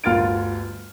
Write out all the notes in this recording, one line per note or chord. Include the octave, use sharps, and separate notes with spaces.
G1 D2 F4 F6 A6 D7